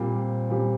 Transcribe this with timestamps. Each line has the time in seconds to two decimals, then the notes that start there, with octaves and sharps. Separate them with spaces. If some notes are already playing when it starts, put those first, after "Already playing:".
Already playing: A#2 G3 C4 G4 C5
0.50 A#2 G3 C4 G4 C5